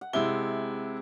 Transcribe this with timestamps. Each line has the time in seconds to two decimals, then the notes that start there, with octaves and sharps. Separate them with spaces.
0.01 F#5
0.13 C3 G#3 E4 G7